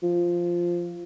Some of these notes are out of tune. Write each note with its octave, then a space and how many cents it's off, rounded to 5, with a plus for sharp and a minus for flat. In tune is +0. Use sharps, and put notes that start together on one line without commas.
F3 -5